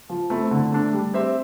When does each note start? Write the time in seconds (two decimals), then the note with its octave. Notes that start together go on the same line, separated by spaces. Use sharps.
0.10 F3
0.30 A3 C4 E4
0.51 D3
0.72 A3 D4
0.93 G3
1.14 C4 G4 C5 E5